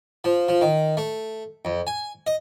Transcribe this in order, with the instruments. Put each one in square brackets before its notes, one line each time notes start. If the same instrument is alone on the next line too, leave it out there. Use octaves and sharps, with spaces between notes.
[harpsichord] F3
F3
D#3
A3
F2
G#5
D#5